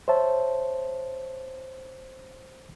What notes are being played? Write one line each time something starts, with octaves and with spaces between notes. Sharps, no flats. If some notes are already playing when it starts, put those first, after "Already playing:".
C5 C#5 E5 A5